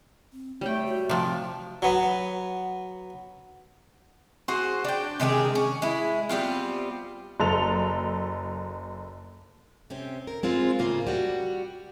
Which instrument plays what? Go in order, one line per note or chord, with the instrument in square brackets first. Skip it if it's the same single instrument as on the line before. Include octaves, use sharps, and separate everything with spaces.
[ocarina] C4
[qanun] G3 G5 [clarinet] A3 [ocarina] C#5
[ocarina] F#4
[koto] C3 F3
[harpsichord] F#3 B3
[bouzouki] F#4 G#4 C5
D4 G5
C3 D#3 G#3 G#4
C#4
G#3 E4
G3 B3 C4 F4
[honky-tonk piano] F#1 A4 F7
[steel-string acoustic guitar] C3 C4 C#4 G4
A#4
G2 G#3 C4 F4 A#4
A2 C#3 A#3 F4 G#4 C5
G3 F#4